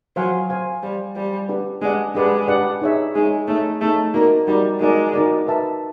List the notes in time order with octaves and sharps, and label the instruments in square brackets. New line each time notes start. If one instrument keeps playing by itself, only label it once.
[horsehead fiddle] F#3 [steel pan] C5 F5 G#5
[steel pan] C5 F5 G#5
[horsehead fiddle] G3 [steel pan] C5 F5 G#5
[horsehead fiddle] G3 [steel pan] C5 F5 G#5
[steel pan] D4 G4 B4 D5 F#5
[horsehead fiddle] G#3 [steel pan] D4 G4 B4 D5 F#5
[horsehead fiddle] G#3 [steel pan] D4 G4 B4 D5 F#5
[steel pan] D4 G4 B4 D5 F#5
D#4 G#4 C#5 E5
[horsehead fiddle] G#3 [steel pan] D#4 G#4 C#5 E5
[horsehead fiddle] A3 [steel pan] D#4 G#4 C#5 E5
[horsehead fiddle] A3 [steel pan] D#4 G#4 C#5 E5
[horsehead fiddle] A#3 [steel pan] D#4 F#4 A#4 D5
[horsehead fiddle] G3 [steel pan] D#4 F#4 A#4 D5
[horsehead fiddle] G#3 [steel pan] D#4 F#4 A#4 D5
[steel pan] D#4 F#4 A#4 D5
B4 E5 A5